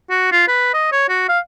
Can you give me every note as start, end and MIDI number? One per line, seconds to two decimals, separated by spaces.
0.10 0.29 66
0.32 0.44 65
0.48 0.71 71
0.74 0.91 75
0.92 1.05 73
1.09 1.24 66
1.29 1.39 77